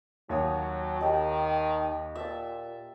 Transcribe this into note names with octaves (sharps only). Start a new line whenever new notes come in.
D#2 F#3 C#5 D#6
D#3 D#4 G4
A#2 E5 A5